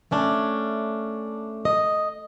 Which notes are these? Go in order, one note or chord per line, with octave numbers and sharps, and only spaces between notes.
A3 C#4 D4
D#5